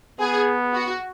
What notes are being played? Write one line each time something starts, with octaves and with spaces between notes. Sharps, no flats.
B3 G#4
F#4